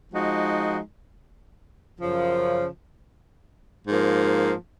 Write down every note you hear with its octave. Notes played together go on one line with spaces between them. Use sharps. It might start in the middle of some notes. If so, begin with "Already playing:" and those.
F3 G#3 D#4 F#4
F#2 C#3 F3
G#2 F3 A#3